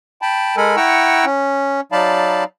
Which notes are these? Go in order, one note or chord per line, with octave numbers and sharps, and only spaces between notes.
G5 A5 B5
G#3 A4 A#4 G#5 B5
E4 F#5 G5 A#5 C#6 E6
C#4
F#3 D#4 D5 F5 A5 B5